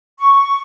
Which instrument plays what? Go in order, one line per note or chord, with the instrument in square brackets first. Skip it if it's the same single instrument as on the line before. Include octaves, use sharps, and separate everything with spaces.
[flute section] C#6